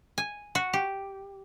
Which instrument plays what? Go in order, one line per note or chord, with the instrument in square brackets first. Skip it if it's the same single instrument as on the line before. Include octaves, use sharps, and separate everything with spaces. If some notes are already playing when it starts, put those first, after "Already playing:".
[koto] G#5
F#4
G4